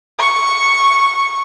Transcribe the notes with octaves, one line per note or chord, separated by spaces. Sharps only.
C#6